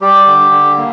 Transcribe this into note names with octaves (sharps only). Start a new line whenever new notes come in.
G3 G4
D3
D3
A#3